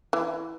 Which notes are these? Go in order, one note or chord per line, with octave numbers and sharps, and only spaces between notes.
E3